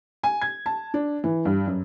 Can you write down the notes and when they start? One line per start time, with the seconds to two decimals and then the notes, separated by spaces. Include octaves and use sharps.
0.23 G#5
0.41 G#6
0.66 A5
0.94 D4
1.24 E3
1.45 G2
1.67 F#2